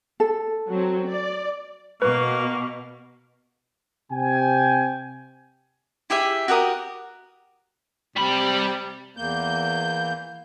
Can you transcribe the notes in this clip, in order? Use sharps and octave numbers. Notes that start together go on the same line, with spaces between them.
A4
F#3 C4
D5
B2 A#3 B4 C#6
C3 G5 G#5
E4 G4 G#4 E5
F#4 G4 A#4 D#6
C3 G3 B5
E2 A#3 G6